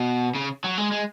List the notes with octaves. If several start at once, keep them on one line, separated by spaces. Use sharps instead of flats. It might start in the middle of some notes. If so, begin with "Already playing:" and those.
Already playing: B2
C#3
F#3
G#3
G#3